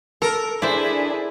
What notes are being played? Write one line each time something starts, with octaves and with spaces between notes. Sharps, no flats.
A4 A#4
D4 E4 G#4 C5 D5